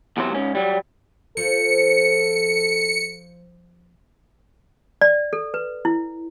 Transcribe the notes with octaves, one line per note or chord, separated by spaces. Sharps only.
E2 C3 F#3 C5
G#2 C#4
F#3 G3
F3 A4 C#7
D5
A4
B4
E4